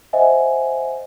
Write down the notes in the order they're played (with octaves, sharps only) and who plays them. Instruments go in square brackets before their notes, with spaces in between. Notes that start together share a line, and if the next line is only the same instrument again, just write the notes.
[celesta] C5 D#5 E5 F#5 G#5